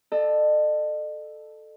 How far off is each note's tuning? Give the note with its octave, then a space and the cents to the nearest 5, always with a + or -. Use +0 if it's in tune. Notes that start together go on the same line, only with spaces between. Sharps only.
A4 +0 D#5 -45